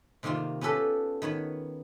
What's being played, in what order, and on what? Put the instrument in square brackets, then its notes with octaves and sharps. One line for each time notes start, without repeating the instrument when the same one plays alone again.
[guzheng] C3 D#3 A#3 C4 F4
B3 C#4 G4 A4 B4 B5
D#3 B3 C#5 B5